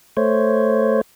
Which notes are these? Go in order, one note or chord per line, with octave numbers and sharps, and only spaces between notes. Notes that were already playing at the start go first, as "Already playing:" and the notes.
A3 C5 C#5